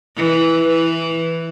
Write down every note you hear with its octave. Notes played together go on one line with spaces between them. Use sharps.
E3
E3